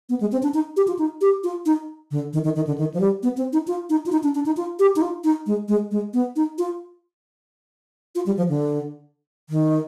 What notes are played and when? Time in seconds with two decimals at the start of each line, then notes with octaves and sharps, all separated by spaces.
0.09 B3
0.20 G#3
0.32 C4
0.43 D4
0.54 D#4
0.77 G4
0.88 F4
0.99 D#4
1.21 G4
1.44 F4
1.66 D#4
2.11 D3
2.33 D#3
2.44 D#3
2.56 D#3
2.67 D3
2.78 D#3
2.94 F3
3.00 G3
3.23 B3
3.37 C4
3.53 D#4
3.67 F4
3.90 D#4
4.06 F4
4.12 D#4
4.23 D4
4.35 D4
4.46 D#4
4.57 F4
4.79 G4
4.96 D#4
5.02 F4
5.24 D#4
5.46 G#3
5.68 G#3
5.91 G#3
6.13 B3
6.36 D#4
6.58 F4
8.15 F4
8.26 G3
8.37 F3
8.49 D3
9.50 D#3